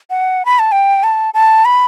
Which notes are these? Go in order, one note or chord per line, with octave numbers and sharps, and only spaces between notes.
F#5
B5
A5
G5
A5
A5
B5